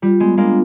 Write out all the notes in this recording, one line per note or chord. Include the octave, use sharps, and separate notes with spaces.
G3 F4
G#3 B3
G#3 A#3 D4